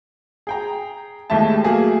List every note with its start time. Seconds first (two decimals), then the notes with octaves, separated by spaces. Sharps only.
0.47 G#4 G5 A#5
1.30 D#2 A2 G#3 G4 E5 A5
1.63 F#3 A3 A#3 G#4